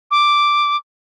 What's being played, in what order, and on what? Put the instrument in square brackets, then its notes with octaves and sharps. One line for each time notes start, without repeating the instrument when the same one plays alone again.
[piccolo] D6